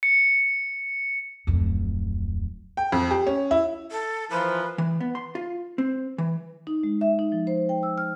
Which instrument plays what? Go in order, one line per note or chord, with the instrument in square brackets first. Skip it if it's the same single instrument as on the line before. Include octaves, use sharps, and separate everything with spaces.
[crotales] C#7
[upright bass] D1 F2
[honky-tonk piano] G5
F2
G4
C#4
E4
[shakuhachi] A4
[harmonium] E3 E4 A#4 [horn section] F3 [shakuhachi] B4
[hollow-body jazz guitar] E3
B3
C6
F4
C4
E3
[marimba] D#4
G#3
E5
D#4
F3
C5
G5
E6
F6